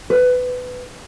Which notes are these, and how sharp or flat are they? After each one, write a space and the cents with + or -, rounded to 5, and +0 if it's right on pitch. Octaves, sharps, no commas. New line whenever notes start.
B4 +20